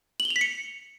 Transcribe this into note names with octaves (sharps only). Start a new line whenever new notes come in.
F#7
G7
F7
B6
C#7